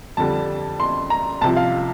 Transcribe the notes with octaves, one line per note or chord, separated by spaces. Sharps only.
F2 D3 G3 A5
C6
A#5
C2 C3 F3 A5
F5